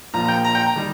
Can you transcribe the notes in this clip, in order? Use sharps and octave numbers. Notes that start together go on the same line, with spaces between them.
A#1 A#2 F3 A#5
A#5
G5
A#5
G5
A#5
D#3 G3